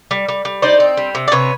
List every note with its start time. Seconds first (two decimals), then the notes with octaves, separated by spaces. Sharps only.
0.11 G3
0.28 G3
0.45 G3
0.62 D#4 C5 D5
0.80 C4
0.97 G3
1.15 C3
1.28 D5
1.32 C3 B4 C#5